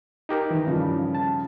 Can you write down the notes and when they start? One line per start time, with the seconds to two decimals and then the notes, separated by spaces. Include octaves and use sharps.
0.29 D#4 G4 A#4
0.51 D#3 E3
0.66 G2 C#3 F3
1.15 A5